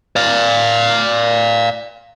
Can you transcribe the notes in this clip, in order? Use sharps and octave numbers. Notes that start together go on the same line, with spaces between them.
D5 F5